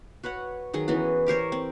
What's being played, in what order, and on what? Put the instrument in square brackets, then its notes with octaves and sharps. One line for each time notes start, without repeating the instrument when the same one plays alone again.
[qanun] F#4 B4 C#5 F#5
D#3 F#3 G#4
E3 B3 C#4 F#4
G4 A#4 C5 C#5
C4